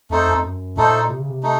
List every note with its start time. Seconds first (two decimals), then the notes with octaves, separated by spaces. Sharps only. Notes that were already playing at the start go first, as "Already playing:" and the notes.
0.10 F2 A3 D#4 A4 C5
0.32 F2
0.43 F#2
0.76 A#2 A3 D#4 A4 C5
1.10 C3
1.20 C#3
1.30 C3
1.43 A3 D#4